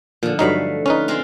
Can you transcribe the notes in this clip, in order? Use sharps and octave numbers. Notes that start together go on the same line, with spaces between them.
A#2 D3 F3
G2 F#3 A3 D#4 F5 B5
C#4 D#4 F4 B4
G#3 C4 F4